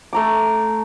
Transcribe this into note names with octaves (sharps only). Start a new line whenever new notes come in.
A3 A#5 D6